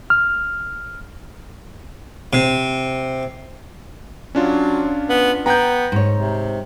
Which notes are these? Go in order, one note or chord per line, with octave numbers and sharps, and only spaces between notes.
F6
C3
F#3 C#4 D4 F4
B3
B3 G5 A#5 G6
G#2 C#5
C3